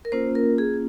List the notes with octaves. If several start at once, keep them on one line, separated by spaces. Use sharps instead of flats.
A#4
A#3 C#4 F4 C5
A#4
G#4